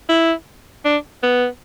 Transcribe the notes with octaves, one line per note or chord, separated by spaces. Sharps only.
E4
D4
B3